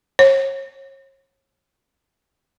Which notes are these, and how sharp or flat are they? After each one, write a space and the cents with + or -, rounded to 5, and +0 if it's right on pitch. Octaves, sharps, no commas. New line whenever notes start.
C#5 -40